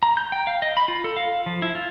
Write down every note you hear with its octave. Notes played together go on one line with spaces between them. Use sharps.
A#5
G6
G5
F5
D#5
B5
F4
A4
F5
F3
E4
F4